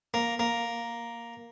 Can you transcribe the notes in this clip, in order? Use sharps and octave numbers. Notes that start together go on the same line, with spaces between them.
A#3
A#3